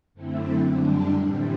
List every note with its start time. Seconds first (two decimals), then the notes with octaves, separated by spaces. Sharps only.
0.14 F#2 D3 A3 C4 E4
0.68 F#2 D3 G3 D4
1.21 A2 E3 G3 C4